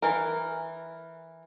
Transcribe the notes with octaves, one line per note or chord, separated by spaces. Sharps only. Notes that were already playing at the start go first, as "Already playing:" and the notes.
E3 A#4